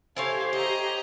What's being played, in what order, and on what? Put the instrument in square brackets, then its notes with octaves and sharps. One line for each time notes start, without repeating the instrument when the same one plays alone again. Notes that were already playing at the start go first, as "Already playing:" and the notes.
[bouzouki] E4 A4 C#5 [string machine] G4 [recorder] C5 [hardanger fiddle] F5 G#5
[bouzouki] C#5 [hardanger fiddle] D#5 A#5